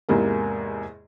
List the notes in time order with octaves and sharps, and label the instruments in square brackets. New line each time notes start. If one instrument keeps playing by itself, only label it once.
[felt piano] E2 G#2 C3 A#3